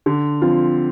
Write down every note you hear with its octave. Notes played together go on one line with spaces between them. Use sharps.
D3
F3 C4 F4